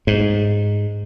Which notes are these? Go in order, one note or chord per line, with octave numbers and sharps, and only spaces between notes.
G#2